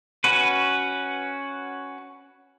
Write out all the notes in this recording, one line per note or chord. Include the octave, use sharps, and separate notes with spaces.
C#4 F#4 B4